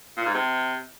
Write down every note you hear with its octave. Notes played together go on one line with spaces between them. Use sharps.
A#2
G#2
C3